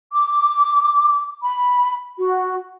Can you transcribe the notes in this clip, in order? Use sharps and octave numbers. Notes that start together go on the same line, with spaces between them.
D6
B5
F#4